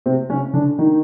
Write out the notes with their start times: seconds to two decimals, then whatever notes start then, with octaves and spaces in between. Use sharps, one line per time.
0.06 C3 C4
0.30 C#3 C#4
0.53 D3 D4
0.78 D#3 D#4